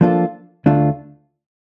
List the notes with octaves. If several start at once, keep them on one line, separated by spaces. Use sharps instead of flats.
F3 A#3 D4 F4 A4
D2 D3 A3 D4 F4